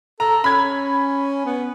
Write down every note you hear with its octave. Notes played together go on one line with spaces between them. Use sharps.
A4 A#5
C#4 B5 G#6
B3